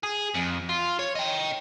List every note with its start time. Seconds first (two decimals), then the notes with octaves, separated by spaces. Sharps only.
0.03 G#4
0.34 F2
0.69 F4
0.99 C#5
1.15 D#5 G5